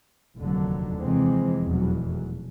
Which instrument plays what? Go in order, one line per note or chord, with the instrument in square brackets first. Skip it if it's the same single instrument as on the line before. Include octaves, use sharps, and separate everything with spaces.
[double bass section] F1 D#2 D3 F#3
F2 C3 E3 G#3 C4
F1 E2 B2 F#3